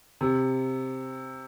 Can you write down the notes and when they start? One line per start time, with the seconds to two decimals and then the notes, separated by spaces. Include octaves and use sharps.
0.21 C3